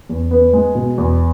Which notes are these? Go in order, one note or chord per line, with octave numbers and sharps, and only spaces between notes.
E2
B3
G#3
B2
E2